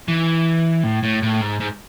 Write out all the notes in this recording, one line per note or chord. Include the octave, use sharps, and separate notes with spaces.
E3
A2
A2
A2
G#2
G#2